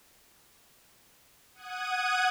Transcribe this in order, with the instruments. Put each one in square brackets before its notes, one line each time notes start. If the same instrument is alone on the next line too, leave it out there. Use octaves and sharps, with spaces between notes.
[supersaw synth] F#5 D#6 F#6 G#6 D#7